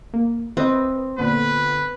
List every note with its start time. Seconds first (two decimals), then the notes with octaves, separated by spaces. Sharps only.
0.14 A#3
0.57 C4 B4 D#5
1.18 A#2 D3 B3 B4